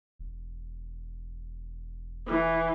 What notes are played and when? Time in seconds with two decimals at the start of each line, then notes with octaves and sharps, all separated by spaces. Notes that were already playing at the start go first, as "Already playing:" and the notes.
0.19 E1
2.27 E3